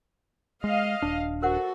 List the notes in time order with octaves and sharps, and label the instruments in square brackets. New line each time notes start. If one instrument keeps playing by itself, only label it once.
[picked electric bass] G#3 [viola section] D#5 F5
[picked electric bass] D#1 D4
[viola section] F#4 A4 [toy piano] A#4 C5 F#5